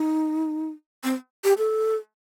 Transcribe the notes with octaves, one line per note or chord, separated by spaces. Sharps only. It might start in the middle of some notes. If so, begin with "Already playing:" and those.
Already playing: D#4
C4
G4
A4